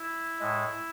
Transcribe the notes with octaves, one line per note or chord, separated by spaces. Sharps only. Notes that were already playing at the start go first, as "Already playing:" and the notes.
Already playing: E4
A2 G#3